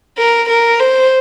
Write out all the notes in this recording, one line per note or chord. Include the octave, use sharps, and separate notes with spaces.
A#4
A#4
C5